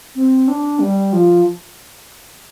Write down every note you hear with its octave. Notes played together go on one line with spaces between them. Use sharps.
C4
D4
G3
F3